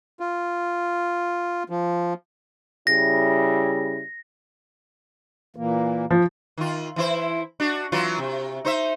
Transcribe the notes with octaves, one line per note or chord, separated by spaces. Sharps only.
F4
F3
C#3 G3 E4 A#6
A#2 E3 A#3
F3
D#3 F4
E3 E4 C5
D4 F#4
E3 F#3 F4
C3
D#4 C5 E5